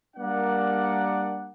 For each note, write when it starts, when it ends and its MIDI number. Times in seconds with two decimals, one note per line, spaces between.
0.16 1.52 55
0.16 1.52 58
0.16 1.52 62
0.16 1.52 70
0.16 1.52 74
0.16 1.52 78